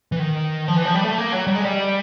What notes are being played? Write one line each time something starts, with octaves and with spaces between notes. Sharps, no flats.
E3
D#3
F3
E3
F3
G3
A3
A#3
F#3
G3
G#3
G3